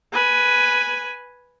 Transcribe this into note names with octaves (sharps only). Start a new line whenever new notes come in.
B4 G#5